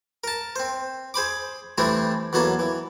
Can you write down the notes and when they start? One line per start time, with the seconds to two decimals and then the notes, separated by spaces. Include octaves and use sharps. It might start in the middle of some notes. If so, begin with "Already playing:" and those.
0.24 A#4 A5
0.56 C4 C5
1.14 G#4 C5 B5 D6
1.78 E3 G3 A3 C4 D4 E4
2.33 E2 F#3 A#3 A4 B4
2.59 E3